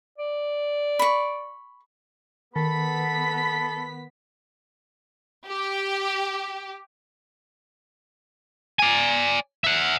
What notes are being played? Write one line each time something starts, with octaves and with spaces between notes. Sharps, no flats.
D5
B5 C#6
D#3 B3 A4 B5 B6
G4
D5 G#5
E5 F#5